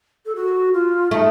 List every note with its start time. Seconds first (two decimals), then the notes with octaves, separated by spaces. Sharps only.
0.26 A4
0.35 F#4
0.74 F4
1.11 A3 D#4